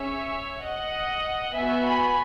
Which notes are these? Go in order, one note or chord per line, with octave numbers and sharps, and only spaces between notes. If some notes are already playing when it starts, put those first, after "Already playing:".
Already playing: C#4 G#4 C#5 E5
D#5 F#5
B3 F#4 E5 G#5
G#5 B5